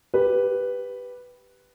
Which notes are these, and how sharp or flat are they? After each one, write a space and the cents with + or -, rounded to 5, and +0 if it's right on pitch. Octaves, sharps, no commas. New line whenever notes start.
G4 +0 B4 +0